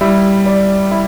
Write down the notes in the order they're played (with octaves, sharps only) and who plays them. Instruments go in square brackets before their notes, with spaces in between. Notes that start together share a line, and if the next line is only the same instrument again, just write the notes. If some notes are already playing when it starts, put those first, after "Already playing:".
[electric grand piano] G3 [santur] E4
[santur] D5
E4